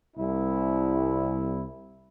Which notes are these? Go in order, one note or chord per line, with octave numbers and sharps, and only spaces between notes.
C2 E4